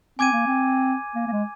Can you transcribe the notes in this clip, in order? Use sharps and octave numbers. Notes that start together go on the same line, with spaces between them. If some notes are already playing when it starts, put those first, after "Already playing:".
C4 G#5 D6 G#6 D#7
A#3
C4
A#3
A#3
G#3